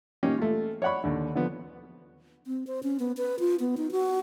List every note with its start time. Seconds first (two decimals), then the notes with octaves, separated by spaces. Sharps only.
0.23 A#3 C#4 D#4 G4
0.38 A3 F4
0.82 C#5 D5 F#5 B5 C#6
1.04 D#2 D3
1.35 D3 F3 B3
2.47 C4
2.67 C5
2.83 C#4
3.00 B3
3.17 B4
3.40 F4
3.60 B3
3.77 D#4
3.91 F#4